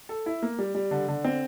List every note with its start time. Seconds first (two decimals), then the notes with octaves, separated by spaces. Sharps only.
0.09 A4
0.26 E4
0.42 A#3
0.59 G3
0.75 G3
0.91 D3
1.08 D3
1.24 C4